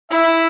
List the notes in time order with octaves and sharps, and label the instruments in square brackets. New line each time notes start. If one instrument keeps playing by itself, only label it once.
[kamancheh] E4 [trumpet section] E5